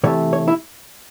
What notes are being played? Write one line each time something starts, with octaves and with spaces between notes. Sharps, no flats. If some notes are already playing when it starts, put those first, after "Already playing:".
C3 E3 A3 C#5
C#5
E4